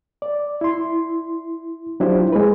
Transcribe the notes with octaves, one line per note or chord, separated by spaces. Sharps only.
D5
E4 C6
F#3 D4 E4 F4 G4 C5
G#3 B4